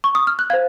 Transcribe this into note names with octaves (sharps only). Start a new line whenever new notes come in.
C#6
D#6
F6
F#6
C5 F5 G#6